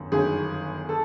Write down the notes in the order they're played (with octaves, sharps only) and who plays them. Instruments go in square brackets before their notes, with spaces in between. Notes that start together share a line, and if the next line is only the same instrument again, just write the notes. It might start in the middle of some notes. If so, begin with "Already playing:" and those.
Already playing: [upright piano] G1 F#2 D#3
G1 F#2 D#3 G#4
A4